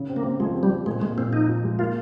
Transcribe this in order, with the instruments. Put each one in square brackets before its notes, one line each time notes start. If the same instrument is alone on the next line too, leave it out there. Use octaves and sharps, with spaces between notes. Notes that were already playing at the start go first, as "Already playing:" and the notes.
Already playing: [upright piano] C#3
C4
[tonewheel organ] A#3
[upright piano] C4
[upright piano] F3 [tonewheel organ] G#3
[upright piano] C4
[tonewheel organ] G3
[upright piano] C4
[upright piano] A#2 [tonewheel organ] G#3
[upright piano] A#2 [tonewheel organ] G#3
[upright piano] A#2 [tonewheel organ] C4
[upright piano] F3 [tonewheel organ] D#4
[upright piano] F3
G#3
[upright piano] A#3 [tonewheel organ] F4